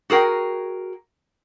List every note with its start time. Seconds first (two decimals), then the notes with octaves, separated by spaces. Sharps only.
0.10 F#4 G#4 A#4 G5